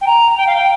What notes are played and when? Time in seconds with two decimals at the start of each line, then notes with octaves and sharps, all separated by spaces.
0.01 G5
0.07 A#5
0.37 G5
0.47 F5
0.55 G5